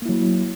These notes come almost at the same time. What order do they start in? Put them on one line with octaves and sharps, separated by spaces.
A#3 E4 F#3